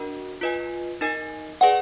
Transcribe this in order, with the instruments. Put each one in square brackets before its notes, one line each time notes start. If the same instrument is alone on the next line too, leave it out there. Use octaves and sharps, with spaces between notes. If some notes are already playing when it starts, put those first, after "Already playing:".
Already playing: [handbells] D4 F#4 A#4 D#5
F4 B4 D#5 G#5
D#4 A#4 D#5 G#5
[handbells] G#4 B4 D5 G#5 [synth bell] F#5